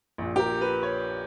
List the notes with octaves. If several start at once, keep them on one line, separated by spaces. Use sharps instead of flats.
A#1 A#2
G4
A#4
B4
C#5